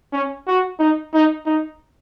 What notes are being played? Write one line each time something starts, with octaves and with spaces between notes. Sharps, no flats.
C#4
F#4
D#4
D#4
D#4